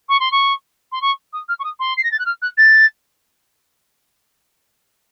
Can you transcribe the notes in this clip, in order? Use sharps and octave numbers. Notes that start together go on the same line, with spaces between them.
C#6
C6
C#6
C6
C#6
D#6
F6
C#6
D#6
C6
C7
A#6
A6
F#6
F6
F#6
A6